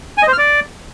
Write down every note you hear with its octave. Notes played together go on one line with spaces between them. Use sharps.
G#5
D#5
C5
F6
D5